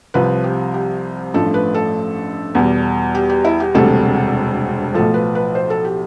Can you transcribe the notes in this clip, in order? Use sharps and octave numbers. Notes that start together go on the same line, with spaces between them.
C2 C3 F3 B4
G4
G4
A1 G2 F3 A3 A4
B4
A4
E2 B2 G3
G4
G4
E4
G4
E1 D2 C3 G3 A4
B1 A2 F3 A4
B4
B4
C5
A4
G4